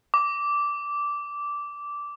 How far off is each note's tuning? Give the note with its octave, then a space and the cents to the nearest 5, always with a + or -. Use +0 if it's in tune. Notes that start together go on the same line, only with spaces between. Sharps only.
D6 -10